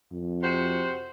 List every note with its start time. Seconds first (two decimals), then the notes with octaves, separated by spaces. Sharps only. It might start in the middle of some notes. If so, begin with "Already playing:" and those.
0.12 F2
0.43 C3 F#4 C5